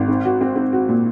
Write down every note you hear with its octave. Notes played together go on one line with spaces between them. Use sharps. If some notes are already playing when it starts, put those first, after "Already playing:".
Already playing: G#1
C4
F#4
C4
C4
F#4
A#2